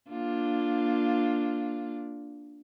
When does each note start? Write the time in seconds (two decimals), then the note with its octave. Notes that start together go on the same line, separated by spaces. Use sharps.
0.10 A#3 D4 F4